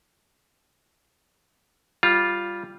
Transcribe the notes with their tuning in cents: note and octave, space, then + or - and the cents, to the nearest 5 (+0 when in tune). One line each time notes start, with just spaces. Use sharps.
G3 +0 F4 +0